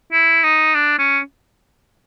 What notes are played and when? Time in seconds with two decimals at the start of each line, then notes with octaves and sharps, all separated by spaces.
0.12 E4
0.43 D#4
0.74 D4
0.99 C#4